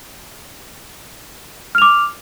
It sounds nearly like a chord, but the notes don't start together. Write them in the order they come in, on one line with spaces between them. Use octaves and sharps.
F6 F7 D6